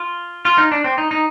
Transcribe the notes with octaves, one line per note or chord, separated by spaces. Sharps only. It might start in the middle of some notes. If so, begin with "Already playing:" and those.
Already playing: F4
F4
D#4
D4
C4
D#4
D#4